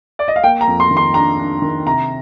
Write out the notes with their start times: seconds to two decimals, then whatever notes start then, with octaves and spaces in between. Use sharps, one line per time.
0.19 D5
0.28 D#5
0.36 F5
0.43 A#3 G5
0.61 A#5
0.67 F2
0.80 C6
0.91 D#3
0.97 C6
1.14 D4 A#5
1.39 D4
1.62 D#3
1.87 C3 A#5